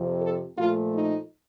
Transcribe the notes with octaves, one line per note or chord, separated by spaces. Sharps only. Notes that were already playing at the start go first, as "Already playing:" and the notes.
Already playing: F2 C3 F3
A4
A#2 F3 A3 F4
D#4